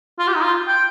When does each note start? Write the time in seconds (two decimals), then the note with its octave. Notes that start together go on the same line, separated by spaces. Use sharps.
0.19 F4
0.27 G4
0.35 D#4
0.43 F4
0.67 G5